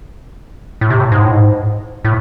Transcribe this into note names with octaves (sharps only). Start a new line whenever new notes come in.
A2
C3
A2
G#2
A2
G#2
A2